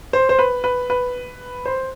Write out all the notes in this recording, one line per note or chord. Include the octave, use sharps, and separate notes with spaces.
C5
C5
B4
B4
B4
C5